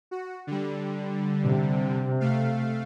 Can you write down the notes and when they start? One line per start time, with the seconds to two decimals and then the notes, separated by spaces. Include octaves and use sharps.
0.11 F#4
0.47 D3 G3
1.43 C3
2.20 A3 F5